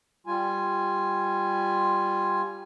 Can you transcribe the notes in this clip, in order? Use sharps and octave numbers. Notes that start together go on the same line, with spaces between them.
G3 F4 G#5